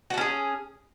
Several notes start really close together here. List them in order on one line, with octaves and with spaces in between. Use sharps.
F#4 A4 C#4 G#4